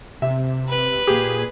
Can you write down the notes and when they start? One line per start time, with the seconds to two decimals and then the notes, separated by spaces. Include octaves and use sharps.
0.22 C3 E5
0.68 B4
1.07 A#2 G4 G#4